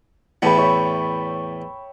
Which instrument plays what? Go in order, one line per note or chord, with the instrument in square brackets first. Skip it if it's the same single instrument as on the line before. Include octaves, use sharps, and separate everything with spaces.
[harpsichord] E2 A2 [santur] G5 A5 B5
[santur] C#5 E5